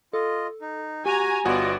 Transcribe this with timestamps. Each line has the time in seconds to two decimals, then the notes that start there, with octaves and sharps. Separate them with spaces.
0.13 F4 A4 D#5
0.61 D#4
1.06 F#4 G4 G#5 A#5
1.45 G1 B3 F4 F#4 D5 D#5